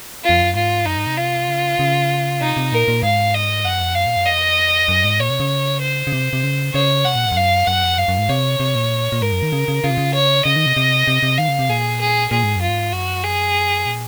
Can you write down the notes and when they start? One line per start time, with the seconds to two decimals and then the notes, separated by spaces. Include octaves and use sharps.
0.25 F2 F4
0.42 F#2
0.55 G#2 F4
0.86 F#2 D#4
0.97 G#2
1.07 C3
1.18 F4
1.48 C#3
1.79 C#3
2.41 C3 D#4
2.57 C3
2.72 A#2 A#4
2.88 A#2
3.03 G#2 F5
3.34 D#5
3.65 F#2 F#5
3.80 F2
3.95 F#2 F5
4.06 A#2
4.16 F#2
4.27 F2 D#5
4.88 F#2
5.04 G#2
5.20 A#2 C#5
5.30 C3
5.40 C#3
5.82 C5
6.07 C#3
6.13 C3
6.33 C3
6.43 C#3
6.74 C#3 C#5
7.05 C3 F#5
7.15 A#2
7.26 G#2
7.32 F2
7.36 F#2 F5
7.67 F#2 F#5
7.83 F2
7.98 F#2 F5
8.08 F#2
8.18 G#2
8.29 C3 C#5
8.60 C3
8.75 A#2
9.12 A#2
9.22 G#2 A#4
9.32 F#2
9.43 D#3
9.52 C#3
9.68 C#3
9.84 C#3 F4
9.91 C3
9.98 C#3
10.14 C#5
10.45 C#3 D#5
10.56 D#3
10.66 C3
10.77 C3
11.07 C3
11.23 C3
11.38 D#3 F5
11.49 C#3
11.59 C3
11.69 A#2 G#4
12.01 G#4
12.31 A#2 G#4
12.44 G#2
12.56 F#2
12.62 F4
12.69 G#2
12.93 F#2 F#4
13.24 G#4
13.86 A#2